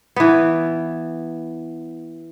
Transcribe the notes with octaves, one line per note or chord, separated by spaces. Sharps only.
E3 B3